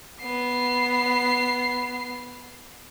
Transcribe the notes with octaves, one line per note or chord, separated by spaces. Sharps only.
B3 C7